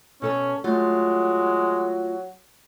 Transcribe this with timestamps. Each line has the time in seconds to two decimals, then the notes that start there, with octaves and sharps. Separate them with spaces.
0.22 B2 C#4 A4 A5
0.64 F#3 G#3 A3 F4